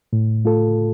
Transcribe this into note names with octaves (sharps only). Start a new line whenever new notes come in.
A2
A3 F4 A4